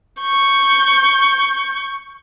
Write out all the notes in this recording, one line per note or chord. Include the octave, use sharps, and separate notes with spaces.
C#6 G6